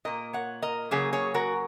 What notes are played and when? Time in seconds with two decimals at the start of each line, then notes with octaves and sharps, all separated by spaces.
0.05 A#2 A#3 A#4 D#5
0.33 C#5 F#5
0.62 A#4 D#5
0.91 C#3 F#3 A#3 G#4 C#5
1.13 G#4 C#5
1.34 F#4 A#4